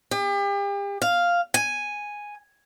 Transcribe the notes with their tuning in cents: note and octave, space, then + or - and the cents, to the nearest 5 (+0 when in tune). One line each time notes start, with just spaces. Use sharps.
G4 +40
F5 +0
G#5 -5